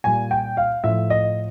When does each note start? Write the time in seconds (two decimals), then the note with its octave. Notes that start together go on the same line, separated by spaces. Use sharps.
0.04 A#2 G3 G#5
0.31 G5
0.57 F5
0.84 A2 F3 E5
1.10 D#5